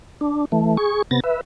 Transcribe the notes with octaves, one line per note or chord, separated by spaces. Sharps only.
D4
E3 A3
G#4 C#6
C3 B3 A6 A#6
B4 E5